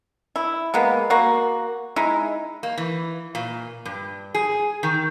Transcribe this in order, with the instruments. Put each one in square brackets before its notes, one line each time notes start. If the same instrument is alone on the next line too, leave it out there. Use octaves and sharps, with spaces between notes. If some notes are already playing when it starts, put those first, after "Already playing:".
[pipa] E4
G#3 A#3 B3
A#3 F#4
G#3 D#4 E4
[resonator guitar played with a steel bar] A#3
E3
A#2
G2
G#4
D#3